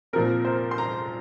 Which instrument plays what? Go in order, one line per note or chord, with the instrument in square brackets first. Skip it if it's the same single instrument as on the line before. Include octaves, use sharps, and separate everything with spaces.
[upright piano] A#2 F3 C4 A#4
C5
C6
A#5